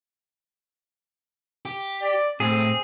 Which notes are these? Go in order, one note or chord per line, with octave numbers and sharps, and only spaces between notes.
G4
D5
A2 C4 G#4